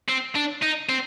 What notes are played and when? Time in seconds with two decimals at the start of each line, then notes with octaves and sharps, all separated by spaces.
0.08 C4
0.36 D4
0.63 D#4
0.89 C4